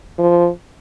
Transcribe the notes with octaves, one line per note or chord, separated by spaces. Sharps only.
F3